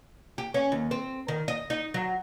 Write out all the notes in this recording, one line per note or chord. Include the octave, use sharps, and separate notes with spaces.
G4
C#4
D#2
C4
D#3
D#5
D#4
F#3